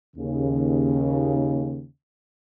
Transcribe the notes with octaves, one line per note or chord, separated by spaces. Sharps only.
D#2 C#3